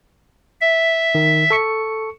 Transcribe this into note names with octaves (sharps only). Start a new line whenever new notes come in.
E5
D#3
A4 C#6 C#7